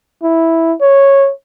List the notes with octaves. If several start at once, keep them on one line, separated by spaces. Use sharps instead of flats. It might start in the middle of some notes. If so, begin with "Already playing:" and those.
E4
C#5